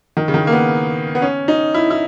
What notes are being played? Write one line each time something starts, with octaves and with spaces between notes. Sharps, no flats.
D#3
C#3
D#3
A#3
B3
B3
C#4
D#4
E4
E4